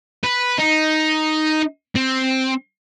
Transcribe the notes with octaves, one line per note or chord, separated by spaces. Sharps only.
B4
D#4
C4